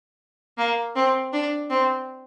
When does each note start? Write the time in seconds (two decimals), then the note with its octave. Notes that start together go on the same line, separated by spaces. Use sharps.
0.58 A#3
0.96 C4
1.33 D4
1.70 C4